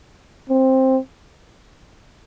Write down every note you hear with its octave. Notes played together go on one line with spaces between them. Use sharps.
C4